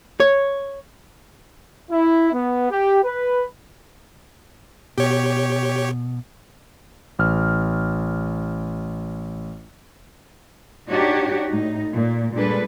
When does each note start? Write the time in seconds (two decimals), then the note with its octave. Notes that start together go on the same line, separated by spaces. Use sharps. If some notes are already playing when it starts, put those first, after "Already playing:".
0.20 C#5
1.90 E4
2.32 B3
2.70 G4
3.04 B4
4.98 B2 G4 C#5
7.19 A1 F6
10.89 D4 D#4 F#4 G4 C#5
11.49 A2 D#4
11.92 A#2
12.33 A#2 G3 G#3 D4 A4 B4